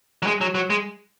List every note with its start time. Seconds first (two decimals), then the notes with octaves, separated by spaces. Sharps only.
0.22 F#3
0.27 G#3
0.41 F#3
0.55 F#3
0.70 G#3